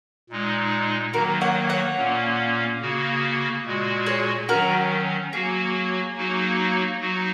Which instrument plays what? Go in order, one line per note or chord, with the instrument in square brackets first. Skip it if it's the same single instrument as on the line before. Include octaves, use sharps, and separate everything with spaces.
[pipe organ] A#2 G#3 D#4
[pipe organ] D#3 F#3 A#3 [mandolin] F#4 A#4
[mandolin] C#5 F#5
C#5 F#5
[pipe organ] A#2 A#3 C#4
C#3 A#3 F#4
A#2 G#3 F#4
[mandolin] G#4 C#5
[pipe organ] D#3 F#3 C#4 [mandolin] F#4 A#4
[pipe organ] F#3 A#3 F#4 [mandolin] G#4
[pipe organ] F#3 A#3 D#4 F#4
F#3 D#4 F#4